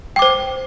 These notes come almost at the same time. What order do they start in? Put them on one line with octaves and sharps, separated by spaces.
G5 D6 C5